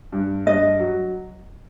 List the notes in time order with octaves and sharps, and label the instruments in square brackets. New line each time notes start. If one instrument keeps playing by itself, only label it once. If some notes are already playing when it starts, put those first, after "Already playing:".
[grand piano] G2
[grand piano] G2 [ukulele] D#5
[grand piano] F#3